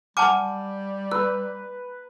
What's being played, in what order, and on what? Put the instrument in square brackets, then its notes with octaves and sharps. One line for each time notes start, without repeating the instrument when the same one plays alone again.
[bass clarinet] G3 [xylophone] F#5 G#5 F6 [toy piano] A5 D6
[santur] B4 [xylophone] E6